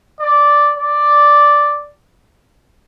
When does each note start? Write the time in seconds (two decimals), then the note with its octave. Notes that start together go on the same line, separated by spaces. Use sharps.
0.20 D5
0.78 D5